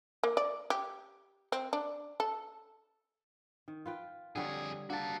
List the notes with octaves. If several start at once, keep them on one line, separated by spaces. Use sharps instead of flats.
A#3
D5
G4
C4
D4
A4
D#3
F4 B4 G5
F2 D3 G3 G#4 C#5
D3 A#3 F#4 A5